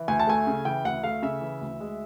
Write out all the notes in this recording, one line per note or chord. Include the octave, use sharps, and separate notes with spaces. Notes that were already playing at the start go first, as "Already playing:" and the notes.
Already playing: E3
D2 G#5
A5
A3 G#5
C#3
E3 G5
D2 F#5
A3 F5
C#3 E5
E3
D2
G#3